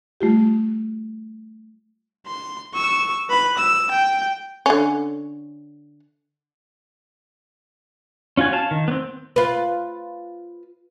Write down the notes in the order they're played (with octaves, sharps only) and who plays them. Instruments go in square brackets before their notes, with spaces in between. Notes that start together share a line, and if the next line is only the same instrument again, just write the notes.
[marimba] G3 A3 F4 G4
[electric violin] C6
C#6 E6
B4 B5
E6
G5
[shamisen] D3 C#4
[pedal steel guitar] C#4 F4 F#4 G#5
F5 A5
D#3
B3 C4
[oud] F4 B4